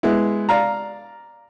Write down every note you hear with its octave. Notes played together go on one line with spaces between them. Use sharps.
G#3 B3 E4
D5 F5 A#5